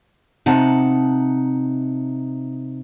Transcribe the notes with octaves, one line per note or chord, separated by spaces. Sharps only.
C3 D#4 F#5 A5